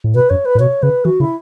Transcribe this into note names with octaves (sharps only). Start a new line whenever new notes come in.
A2
B2 B4
F#2 C#5
B4
A2
B2 C#5
C#3 B4
E3 F#4
C#3 E4